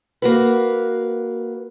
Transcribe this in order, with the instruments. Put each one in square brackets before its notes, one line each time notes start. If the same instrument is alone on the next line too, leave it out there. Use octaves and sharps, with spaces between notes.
[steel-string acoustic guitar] A#3 F#4 B4